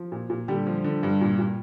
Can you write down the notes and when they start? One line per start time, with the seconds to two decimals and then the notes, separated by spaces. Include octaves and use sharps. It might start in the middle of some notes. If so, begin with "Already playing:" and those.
Already playing: F3
0.12 A#2
0.30 A#2
0.48 D3 G3 G4
0.67 F3
0.84 D3
1.03 G2
1.21 A#2
1.38 A#2